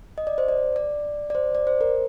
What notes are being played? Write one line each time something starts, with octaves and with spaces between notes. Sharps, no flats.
D#5
D5
C5
D5
D5
D5
C5
D5
C5
A#4